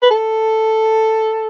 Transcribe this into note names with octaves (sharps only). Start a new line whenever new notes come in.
B4
A4